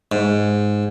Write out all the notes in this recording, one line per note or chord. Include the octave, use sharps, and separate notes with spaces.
G#2